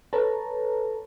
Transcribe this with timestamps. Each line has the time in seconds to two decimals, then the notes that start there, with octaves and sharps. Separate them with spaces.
0.13 A4 B4 C#5 A5 A#5